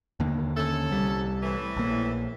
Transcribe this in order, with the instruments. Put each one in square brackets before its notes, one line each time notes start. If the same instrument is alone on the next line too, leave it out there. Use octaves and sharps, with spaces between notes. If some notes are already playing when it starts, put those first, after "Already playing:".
[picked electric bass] D#2 D3 A#3
[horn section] C#4 A4
[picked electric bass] C2 G3
[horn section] A2 E3
[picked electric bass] A#1 A#3